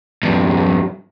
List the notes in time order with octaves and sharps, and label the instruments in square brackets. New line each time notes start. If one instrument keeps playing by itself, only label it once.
[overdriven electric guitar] E2 G2